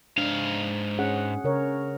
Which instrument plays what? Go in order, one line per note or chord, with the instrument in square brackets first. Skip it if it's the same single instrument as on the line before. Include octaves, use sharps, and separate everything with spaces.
[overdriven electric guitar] G#2 F5 [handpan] D4
[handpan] C#4 G#4 F#5
C#3 A#4 C#5